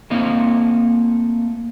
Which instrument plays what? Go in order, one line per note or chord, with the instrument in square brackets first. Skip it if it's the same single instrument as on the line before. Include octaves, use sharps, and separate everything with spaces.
[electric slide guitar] A3 A#3 C4 E4 D#5 F5